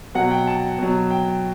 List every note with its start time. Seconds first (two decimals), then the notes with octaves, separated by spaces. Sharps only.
0.15 B2 F#3 F#5
0.31 G5
0.47 A5
0.78 B2 F#3
1.10 G5